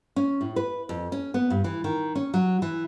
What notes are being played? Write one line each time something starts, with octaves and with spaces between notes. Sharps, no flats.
C#4
A2
B4
F2
C#4
B3
G2
E3
D#3
C#4
F#3
E3